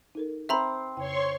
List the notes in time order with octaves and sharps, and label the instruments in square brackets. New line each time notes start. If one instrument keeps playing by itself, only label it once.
[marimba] D#4 A4 A#4
[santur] C4 C5 [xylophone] E5 A#5 B5
[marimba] F2 C#3 G5 [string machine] C#5 C6 C#6